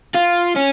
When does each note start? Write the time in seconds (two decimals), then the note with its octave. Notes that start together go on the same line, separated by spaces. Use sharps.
0.15 F4
0.56 C#4